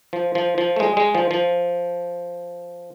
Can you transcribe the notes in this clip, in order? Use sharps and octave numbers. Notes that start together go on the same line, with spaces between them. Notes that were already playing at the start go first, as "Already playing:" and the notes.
F3
F3
F3
A3
G#3
G#3
F3
F3